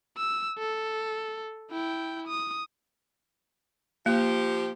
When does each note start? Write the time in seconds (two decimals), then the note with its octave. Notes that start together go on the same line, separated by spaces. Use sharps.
0.17 E6
0.58 A4
1.70 E4 G5
2.27 D#6
4.06 F3 A#3 G4